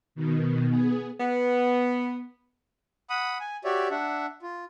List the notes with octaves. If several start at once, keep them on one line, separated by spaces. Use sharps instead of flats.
B2 D#3
B3 G#4
B3
F#5 B5 D#6
G#5
F#4 G4 C#5 D5 E5
D4 E5 F#5
F4